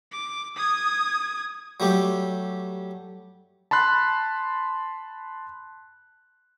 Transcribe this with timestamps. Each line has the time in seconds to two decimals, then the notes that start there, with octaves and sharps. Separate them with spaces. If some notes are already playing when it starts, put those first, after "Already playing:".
0.12 D6
0.56 D#6 G#6
1.80 F#3 G3 A3 G4
3.71 A5 B5 C6 F#6